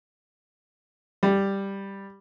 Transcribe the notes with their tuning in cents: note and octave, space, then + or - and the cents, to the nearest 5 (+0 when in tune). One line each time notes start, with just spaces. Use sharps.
G3 +5